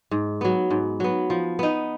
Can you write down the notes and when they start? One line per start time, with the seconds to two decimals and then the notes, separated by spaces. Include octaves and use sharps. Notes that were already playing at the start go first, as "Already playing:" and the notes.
0.11 G#2
0.41 F#3 B3
0.71 G#2
1.00 F#3 B3
1.30 F3
1.59 B3 D#4